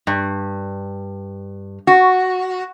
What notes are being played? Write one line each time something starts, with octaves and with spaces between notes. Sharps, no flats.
G2
F#4